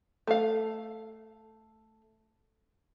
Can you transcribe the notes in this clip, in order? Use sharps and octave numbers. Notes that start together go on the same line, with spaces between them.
A3 F5